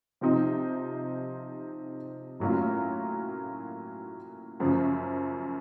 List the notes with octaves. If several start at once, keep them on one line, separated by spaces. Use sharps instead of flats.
C3 F3 C4 D#4
A2 F#3 A#3 C#4 F4
F#2 C#3 F3